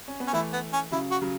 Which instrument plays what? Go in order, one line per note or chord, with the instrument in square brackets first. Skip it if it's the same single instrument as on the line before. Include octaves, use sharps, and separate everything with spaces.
[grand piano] C#4
B3
[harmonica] C#4
[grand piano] E3 A3 [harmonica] E4
[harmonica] B3
C#4
[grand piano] C#3 F#3 [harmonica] E4
[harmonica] F#4
[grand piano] C#3 F#3